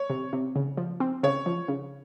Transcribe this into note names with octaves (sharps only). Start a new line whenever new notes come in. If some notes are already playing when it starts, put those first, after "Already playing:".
Already playing: C#5
C3
C3
C#3
F3
C4
C#3 C#5
F3
C#3